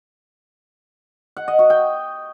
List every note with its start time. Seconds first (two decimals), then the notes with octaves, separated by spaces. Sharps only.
1.37 F#5
1.48 D#5
1.59 F#4
1.70 G5